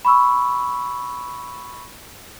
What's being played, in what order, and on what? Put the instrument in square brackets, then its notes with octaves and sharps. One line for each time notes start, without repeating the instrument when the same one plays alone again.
[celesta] B5 C#6 E6